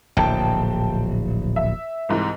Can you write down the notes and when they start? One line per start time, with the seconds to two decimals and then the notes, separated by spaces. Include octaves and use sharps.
0.17 D1 A#1 G5 A5
1.56 E5
2.09 C2 G#2 E3